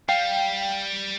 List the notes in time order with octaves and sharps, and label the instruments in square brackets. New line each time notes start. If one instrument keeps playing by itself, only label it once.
[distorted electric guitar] G3 [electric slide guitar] F5 [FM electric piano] G5